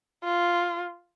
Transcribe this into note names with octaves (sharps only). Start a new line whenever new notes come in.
F4